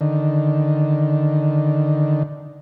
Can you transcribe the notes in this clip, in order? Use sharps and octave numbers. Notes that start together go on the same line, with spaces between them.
D3 D#3